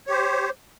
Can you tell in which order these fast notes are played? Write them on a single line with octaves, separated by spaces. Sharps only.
C#5 G4 C5